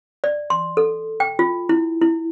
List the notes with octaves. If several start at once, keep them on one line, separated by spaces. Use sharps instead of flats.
D5
C6
A4
G5
F4
E4
E4